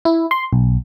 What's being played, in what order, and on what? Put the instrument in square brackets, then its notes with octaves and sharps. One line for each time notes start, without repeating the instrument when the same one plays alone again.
[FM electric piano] E4
C6
B1